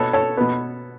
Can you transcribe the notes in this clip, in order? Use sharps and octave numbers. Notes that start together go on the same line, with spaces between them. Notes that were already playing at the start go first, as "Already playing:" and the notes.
Already playing: B2 B3 A4 C#5
A4 C#5
B2 B3